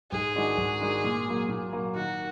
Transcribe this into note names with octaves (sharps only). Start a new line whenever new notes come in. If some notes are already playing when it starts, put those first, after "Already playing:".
G#2 G#4
D#3 G#3 D4 F#4
G#2
D#3 G#3 D4 F#4
A#2
F#3 A#3
A#2
F#3 A#3
D#3 F#4